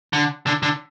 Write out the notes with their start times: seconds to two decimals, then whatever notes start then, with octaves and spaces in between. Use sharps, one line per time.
0.13 D3
0.47 D3
0.63 D3